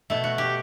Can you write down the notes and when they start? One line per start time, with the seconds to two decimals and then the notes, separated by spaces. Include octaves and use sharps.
0.10 B2 A3
0.24 F#4
0.38 G4